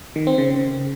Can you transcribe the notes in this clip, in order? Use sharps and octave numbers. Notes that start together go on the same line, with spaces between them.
D#3
C4
C#3